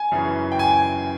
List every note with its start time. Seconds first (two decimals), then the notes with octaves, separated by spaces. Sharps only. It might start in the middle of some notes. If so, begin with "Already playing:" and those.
Already playing: G#5
0.12 F#2 C#3 E3
0.52 G5
0.59 G#5